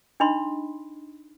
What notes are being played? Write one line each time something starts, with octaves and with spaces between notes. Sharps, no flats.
D4 D#4 D#5 B5 C6